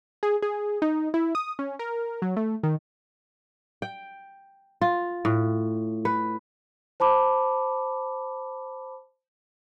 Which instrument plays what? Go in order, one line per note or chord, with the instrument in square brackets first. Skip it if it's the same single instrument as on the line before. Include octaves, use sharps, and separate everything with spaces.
[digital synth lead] G#4
G#4
D#4
E4
D#6
C#4
A#4
F#3
A3
D#3
[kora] G5
F4
A2
B4
[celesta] C5 A5 B5 D6